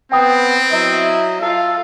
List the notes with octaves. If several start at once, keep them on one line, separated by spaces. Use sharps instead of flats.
B3 C4 G5 D#6
F#3 E4 D#5 E5
F4 A4 F5